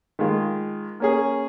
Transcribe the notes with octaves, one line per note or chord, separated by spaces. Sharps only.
D#3 G#3 F4
A#3 C#4 G#4